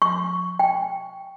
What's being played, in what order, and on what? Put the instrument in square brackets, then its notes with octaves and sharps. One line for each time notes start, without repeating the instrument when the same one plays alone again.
[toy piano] C#6
G5